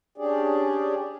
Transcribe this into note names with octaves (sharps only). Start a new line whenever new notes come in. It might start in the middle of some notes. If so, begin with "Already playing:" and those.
C#4 D4 G4 G#4 D5